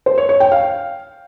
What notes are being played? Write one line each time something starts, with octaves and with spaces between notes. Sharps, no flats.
C5
C#5
C#5
G5
F5